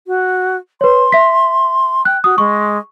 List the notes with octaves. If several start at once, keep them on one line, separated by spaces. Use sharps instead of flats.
F#4
B4 C#5 C6
E5 B6
G5 F#6
F#4 D#6
G#3 C#6